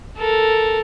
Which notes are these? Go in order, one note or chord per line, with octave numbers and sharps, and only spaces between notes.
A4 A#4